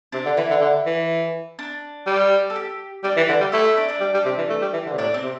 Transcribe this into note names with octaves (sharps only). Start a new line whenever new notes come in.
C3 D4
D3
E3 E4
D3
D3
E3
D4
G3
A4
G4
G3 D4 D5
E3
D3 D4 D5
G3
A3 E4 E5
E4 E5
D4 D5
D4 D5
G3
G3
C3
E3
A3
G3
E3
D3
C3
A2 D4 D5
C4 C5
C3